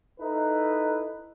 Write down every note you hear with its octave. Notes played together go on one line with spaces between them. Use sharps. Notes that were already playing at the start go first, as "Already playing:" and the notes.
D#4 E4 A4 B4